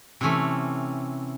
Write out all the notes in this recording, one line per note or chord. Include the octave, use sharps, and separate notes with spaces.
C3 E3 A3 C#4